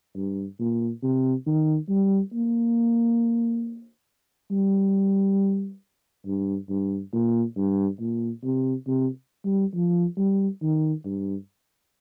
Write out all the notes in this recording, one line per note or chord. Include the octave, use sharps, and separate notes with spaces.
G2
A#2
C3
D#3
G3
A#3
G3
G2
G2
A#2
G2
A#2
C3
C3
G3
F3
G3
D#3
G2